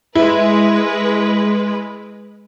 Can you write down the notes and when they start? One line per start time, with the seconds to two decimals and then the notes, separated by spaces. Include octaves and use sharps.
0.15 G#3 E4 B4